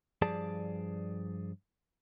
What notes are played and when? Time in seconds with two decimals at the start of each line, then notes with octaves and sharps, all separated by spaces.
0.22 G2 F3 G#4 D5 A5